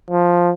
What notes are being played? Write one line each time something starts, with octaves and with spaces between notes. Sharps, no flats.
F3